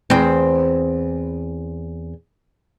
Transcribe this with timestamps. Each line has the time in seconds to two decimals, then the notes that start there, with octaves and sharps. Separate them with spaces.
0.10 E2 C4